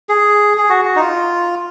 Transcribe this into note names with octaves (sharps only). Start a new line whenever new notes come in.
G#4
G#4
F#4
F#4
D#4
F4